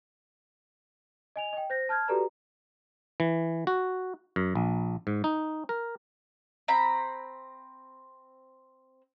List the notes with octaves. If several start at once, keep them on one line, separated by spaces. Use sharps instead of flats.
D#5 G#5 F7
D#5 G5
C5 G6 A#6
A5 F6 G6 G#6
F#4 G4 A4 B4 D5 A#5
E3
F#4
F#2
A#1
G#2
D#4
A#4
C4 A#5 B5